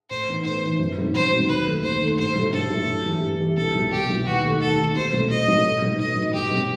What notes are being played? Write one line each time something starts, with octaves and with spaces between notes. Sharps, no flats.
A2 C5
E3 B3 D#4
A2 C5
E3 B3 D#4
F#2
D#3 F#3 C4 D#4
F#2 C5
D#3 F#3 C4 D#4
D#2 B4
D#3 A3
D#2 C5
D#3 A3
G2 C5
F#3 A3 E4
G2 A4
F#3 A3 E4
G2
E3 B3 E4 G4
G2
E3 B3 E4 G4
C2 A4
B2 F#3 B3 E4
C2 G4
B2 F#3 B3 E4
D#2 F#4
D#3 A3 D#4
D#2 A4
D#3 A3 D#4
B2 C5
F#3 A3 C4
B2 D#5
F#3 A3 C4
A2
F#3 B3 D#4
A2 D#5
F#3 B3 D#4
G2 G4
F#3 C4